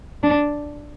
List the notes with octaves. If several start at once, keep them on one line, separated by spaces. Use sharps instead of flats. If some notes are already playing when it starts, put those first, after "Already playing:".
D4